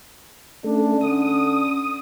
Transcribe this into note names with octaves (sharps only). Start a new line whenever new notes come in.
A3 C#4 D4
D3 D#6